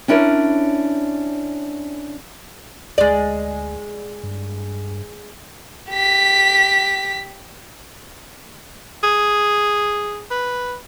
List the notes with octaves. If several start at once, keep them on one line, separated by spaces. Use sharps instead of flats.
C#4 D4 E4 A#4 C#5
D2 G#3 D5
G2
G4 B6
G#4
B4